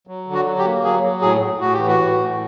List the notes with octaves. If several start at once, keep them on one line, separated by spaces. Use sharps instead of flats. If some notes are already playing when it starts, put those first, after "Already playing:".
F#3
D3
F#4
F#3
G4
A#3
F#3 G#4
F#3
A2 G#4
A2
A2 F#4
G4
E3
F#4
A2
A2